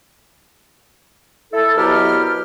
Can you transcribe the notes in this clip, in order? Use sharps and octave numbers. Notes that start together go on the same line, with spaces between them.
E4 A4
C2 B2 F#3 E4 G4 F6